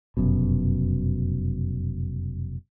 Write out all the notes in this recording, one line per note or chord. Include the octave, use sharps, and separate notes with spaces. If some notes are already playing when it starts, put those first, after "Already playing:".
F1 F#2 B2